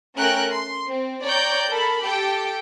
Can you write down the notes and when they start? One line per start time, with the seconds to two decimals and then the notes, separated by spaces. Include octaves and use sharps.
0.18 A3 C#4 A#4 G5 F#6
0.52 C6
0.89 C4
1.24 C#5 D5 G5 A#5 G6
1.69 A4 A#4 B5
2.02 G4 A4 G5